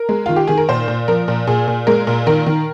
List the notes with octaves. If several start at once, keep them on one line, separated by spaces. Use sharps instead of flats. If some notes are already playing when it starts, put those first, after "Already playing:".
Already playing: A#4
G#3
D#3 F4
G4
D#3 G#4
A#4
A#2 C5
A#2
F3 A#4
A#2
A#2 G#4
A#2
G#3 A#4
A#2
D#3 A#4
D#3